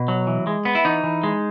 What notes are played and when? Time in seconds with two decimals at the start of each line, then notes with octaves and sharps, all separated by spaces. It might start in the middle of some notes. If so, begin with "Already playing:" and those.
Already playing: B2
0.08 F#3
0.27 E3
0.47 G#3
0.65 B3
0.75 E4
0.85 E3 D#4
1.04 E3
1.23 G#3